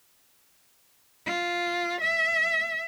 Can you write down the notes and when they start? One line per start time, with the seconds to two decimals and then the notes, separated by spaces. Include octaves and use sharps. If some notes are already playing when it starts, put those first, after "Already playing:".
1.26 F4
2.01 E5